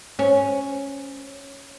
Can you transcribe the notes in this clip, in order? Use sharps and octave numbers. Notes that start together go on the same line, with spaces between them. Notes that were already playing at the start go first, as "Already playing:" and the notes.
C#4